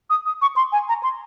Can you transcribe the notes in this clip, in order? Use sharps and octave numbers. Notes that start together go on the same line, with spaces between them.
D#6
D#6
C#6
C6
G#5
A#5
C6